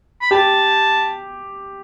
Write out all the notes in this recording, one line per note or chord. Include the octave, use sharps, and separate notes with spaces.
B5
G4 A5